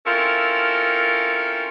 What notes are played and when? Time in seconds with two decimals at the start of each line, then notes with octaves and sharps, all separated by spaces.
0.06 C4 C#4 E4 F4 A4 A#4